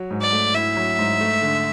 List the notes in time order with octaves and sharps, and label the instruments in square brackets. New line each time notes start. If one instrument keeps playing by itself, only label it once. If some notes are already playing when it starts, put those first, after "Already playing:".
Already playing: [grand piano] F#3
G#2
[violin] D5
[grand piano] A3
[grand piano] E4 [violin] E5
[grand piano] F#3
G#2
A3
D3